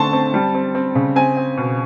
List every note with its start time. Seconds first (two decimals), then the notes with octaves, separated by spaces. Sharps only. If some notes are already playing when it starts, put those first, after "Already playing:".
Already playing: D3 A3 C4 A5 C6 C#6
0.13 C4
0.34 G3
0.54 C4
0.75 C4
0.95 C#3
1.16 C4 G#5
1.37 C4
1.57 B2